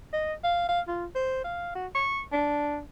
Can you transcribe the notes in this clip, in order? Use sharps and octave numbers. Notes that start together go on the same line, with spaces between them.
D#5
F5
F5
F4
C5
F5
F#4
C#6
D4